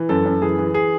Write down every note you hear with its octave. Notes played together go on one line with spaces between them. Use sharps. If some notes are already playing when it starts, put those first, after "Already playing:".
Already playing: E3
F#2 A4
F#2
E3 G#4
E3
G#4